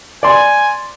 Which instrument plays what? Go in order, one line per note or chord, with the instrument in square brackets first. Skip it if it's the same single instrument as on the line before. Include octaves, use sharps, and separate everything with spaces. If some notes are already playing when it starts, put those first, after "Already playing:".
[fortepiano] D5 C6 [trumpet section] G#5